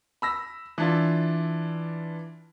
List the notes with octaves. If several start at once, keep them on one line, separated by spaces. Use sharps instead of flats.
B5 E6 A#6
E3 D4 F4